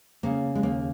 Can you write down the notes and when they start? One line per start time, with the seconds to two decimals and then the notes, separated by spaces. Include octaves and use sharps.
0.23 C#3 A#3
0.55 G#3
0.63 D#2 A#3